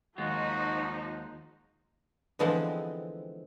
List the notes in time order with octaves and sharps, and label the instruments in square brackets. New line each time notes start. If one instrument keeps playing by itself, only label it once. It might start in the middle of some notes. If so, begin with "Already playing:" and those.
[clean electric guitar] D#2 G#3 F4 [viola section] F3 D#4 [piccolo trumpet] F#4
[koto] D3 E3 F3 G#3 B3 C4